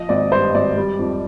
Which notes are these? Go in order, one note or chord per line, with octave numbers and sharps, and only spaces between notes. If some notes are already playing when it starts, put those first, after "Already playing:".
Already playing: F3 D#5
G#1 D5
G2 C5
G#1 D5
G3
F2